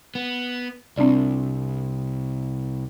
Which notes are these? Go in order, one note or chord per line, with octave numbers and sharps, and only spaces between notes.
B3
C2 C4 D4 D5